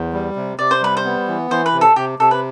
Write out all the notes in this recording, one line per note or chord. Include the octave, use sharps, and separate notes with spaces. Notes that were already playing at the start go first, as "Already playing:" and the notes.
Already playing: E2 C5
G3
C3
C3 D5
C5
G3 B4
C5
B3
E3
E3 C5
B4
C3
A4
C3 G4
C3 A4
B4